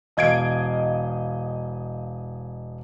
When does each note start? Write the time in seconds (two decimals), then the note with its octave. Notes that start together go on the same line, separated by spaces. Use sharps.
0.17 E1 D#5 F5 G#6 C7 D7